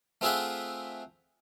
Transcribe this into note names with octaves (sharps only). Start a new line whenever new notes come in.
A3 C4 F4 G#4 E5 F#5